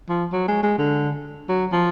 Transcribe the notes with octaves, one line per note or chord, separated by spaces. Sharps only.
F3
F#3
G#3
G#3
D3
F#3
F3